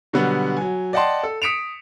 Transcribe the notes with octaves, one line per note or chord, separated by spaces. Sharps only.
B2 D3 F#3 G3 B3 F#4
F#3 G#5
D5 D#5 F#5 G5 A5 C6
A4
D#6 B6 C#7 D7 E7 F7